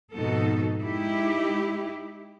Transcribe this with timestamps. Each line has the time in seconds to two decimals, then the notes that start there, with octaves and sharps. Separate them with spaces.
0.12 F2 G#2 B2 D#4 F#4 A4
0.81 G#3 D#4 E4 G4